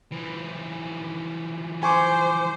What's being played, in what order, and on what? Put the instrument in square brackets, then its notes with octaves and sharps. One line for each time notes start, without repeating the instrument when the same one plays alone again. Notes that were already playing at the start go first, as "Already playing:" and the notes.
[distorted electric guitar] E3 F3
[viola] C5 [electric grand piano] G#5 C#6 D6